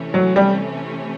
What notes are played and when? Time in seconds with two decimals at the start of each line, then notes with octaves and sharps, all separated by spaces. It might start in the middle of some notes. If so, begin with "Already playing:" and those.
Already playing: C3 E3 A3 C#4
0.14 F#3
0.36 G3